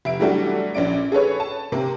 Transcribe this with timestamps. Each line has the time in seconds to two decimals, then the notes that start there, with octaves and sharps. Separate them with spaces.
0.05 F1 E5 D7
0.20 E3 F#3 G3 A3 D4 F#4
0.74 A#1 C#4 D5 D7
1.12 G#4 A4 B4 C#5
1.40 A5
1.72 C3 A#3 C4